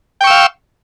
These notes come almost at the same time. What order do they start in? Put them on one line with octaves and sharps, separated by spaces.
G5 C#6 E6 F5